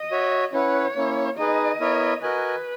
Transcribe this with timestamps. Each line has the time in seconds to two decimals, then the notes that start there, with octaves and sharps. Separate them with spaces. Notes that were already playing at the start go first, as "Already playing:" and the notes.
Already playing: D#5
0.11 F#4 C#5 E5
0.53 C#4 E4 B4 C#5 F#5
0.95 A#3 C#4 E4
1.37 D#4 G#4 B4 D#5
1.80 B3 E4 A#4 C#5 E5
2.22 F#4 A#4 B4 D#5 G#5